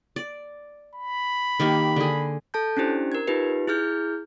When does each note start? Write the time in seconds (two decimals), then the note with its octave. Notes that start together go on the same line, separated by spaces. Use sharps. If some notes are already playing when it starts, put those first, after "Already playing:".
0.16 D5
0.95 B5
1.60 D#3 A#3 G4
1.96 D3 G#4
2.54 A4 A5 G6
2.77 C#4 D4 E4 G4 C5
3.12 A#4 G#6
3.28 D#4 F4 G4 B4
3.68 E4 G#4 F6 G6